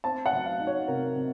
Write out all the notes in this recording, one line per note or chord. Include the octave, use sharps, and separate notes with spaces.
C4 A5
F#5
F#3
F5
D#4
C#5
C3 A#4
C3